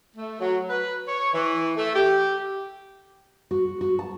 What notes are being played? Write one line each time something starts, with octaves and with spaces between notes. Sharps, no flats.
A3
F#3
B4
C#5
E3
A3
G4
F#4
F#4
A5